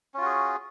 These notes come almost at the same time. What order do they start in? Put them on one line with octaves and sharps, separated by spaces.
C#4 F4 F#4 G#4